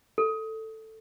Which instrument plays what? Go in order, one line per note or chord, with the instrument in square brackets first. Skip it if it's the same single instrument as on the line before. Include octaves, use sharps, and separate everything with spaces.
[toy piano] A4